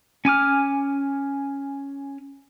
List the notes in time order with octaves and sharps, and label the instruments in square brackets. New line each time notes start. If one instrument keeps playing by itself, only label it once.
[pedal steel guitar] C#4 G#5 D6 F6